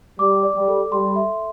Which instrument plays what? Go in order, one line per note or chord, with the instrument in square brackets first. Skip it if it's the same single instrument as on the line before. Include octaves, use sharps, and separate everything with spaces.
[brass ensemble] G3 [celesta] D6
[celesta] D5
[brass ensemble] G3
[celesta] A4
[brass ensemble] G3 [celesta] C6
[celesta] E5